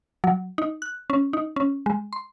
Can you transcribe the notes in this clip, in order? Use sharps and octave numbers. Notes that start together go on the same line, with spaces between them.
F#3
D#4
F#6
C#4
D#4
C#4
G#3
C6